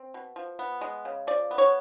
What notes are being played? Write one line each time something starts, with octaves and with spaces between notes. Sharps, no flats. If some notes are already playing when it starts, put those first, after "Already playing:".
Already playing: C4
B2
F3
B3
G#3
C#3
F3 D5
B3
C#5